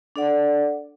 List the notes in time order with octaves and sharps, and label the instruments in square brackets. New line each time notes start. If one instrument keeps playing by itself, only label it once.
[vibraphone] D4 A4 D5 F#5